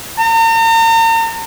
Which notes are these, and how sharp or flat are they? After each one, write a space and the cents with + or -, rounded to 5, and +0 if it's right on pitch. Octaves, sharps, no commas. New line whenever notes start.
A#5 -45